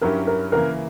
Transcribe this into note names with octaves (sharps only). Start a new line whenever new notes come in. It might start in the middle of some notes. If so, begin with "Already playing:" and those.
G2 F#3 C#4 E4 G4 A#4
A#4
C#3 E3 A#3 A#4